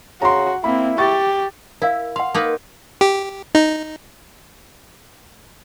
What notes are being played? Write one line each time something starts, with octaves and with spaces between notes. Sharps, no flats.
C#3 F#4 A#5 C6
A#3 C4 E4 B5
G4 C#6 A6
E4 A#4 F5
F5 F#5 C6
A#3 D#4 B4
G4
D#4